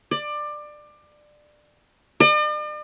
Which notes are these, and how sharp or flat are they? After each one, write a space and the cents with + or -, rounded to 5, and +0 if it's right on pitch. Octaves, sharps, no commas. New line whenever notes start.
D5 +20
D5 +45